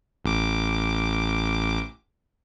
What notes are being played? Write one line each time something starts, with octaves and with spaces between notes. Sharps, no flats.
A1 D6